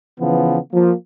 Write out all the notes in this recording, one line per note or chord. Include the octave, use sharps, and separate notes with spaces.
C#3 E3 F3 B3
F3 A#3